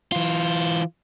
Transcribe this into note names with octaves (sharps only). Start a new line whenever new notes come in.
E3 F4